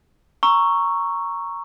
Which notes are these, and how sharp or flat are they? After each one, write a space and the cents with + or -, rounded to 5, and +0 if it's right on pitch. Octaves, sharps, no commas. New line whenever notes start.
A#5 +0 C#6 +0 E6 +15